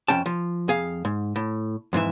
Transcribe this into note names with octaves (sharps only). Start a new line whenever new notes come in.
F2 C#4 G5 A5
F3
F2 G#4 F5
G#2
A2
F2 G#2 E3 E5